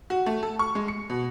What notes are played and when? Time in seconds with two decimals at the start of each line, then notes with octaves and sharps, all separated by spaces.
0.10 F#4
0.26 A3
0.43 A4
0.59 C#6
0.75 G#3
0.88 C#7
1.10 B2